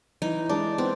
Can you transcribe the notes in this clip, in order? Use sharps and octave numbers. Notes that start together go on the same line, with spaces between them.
E3 D#4
G#3 D4
B3 C4